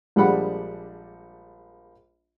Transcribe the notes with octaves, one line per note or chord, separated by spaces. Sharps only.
A#1 G3 G#3 D4 F#5 B5